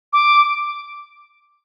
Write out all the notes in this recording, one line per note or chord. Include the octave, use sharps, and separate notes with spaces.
D6